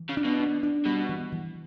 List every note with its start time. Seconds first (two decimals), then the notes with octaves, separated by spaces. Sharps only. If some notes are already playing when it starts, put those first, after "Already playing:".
Already playing: E3
0.09 C#3
0.17 D4
0.24 B2
0.40 D4
0.63 D4
0.86 B2 G3
1.09 E3
1.32 E3